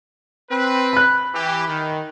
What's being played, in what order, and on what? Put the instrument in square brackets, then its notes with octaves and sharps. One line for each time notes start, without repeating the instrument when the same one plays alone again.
[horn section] C4 B4
[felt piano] B5 F#6
[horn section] E3 G4
D#3